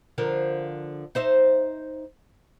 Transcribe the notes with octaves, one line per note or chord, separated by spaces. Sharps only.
D3 F3 A#4
D#4 C5 E5